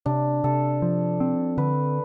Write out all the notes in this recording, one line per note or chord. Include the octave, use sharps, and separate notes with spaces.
C3 D4
C3 A4
F3
C4
D3 B4